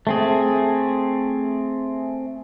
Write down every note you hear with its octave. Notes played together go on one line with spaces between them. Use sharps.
A3 C4 G#4